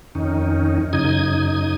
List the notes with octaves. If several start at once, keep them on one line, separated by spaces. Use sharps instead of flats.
F2 D#3 C#4 D#4
F#2 C#3 D#4 D#6 G#6